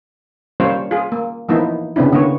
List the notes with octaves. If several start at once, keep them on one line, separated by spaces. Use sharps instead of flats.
G3 A#3 C#4 F4 C5 C#5
F4 G#4
A#3
E3 F3 A#3 B3 D#4 E4
C#3 B3 C4 D4 E4
D3 A#3 B3 C#5